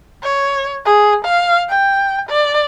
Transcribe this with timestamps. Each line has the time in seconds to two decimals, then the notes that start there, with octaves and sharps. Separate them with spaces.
0.23 C#5
0.85 G#4
1.25 F5
1.70 G5
2.29 D5